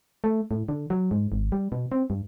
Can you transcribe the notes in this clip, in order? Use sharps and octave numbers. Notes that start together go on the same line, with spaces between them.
A3
A2
D3
F#3
G#2
G#1
G3
B2
C4
G2